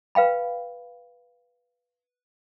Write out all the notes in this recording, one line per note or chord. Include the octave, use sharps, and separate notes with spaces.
B4 F5 G5 B5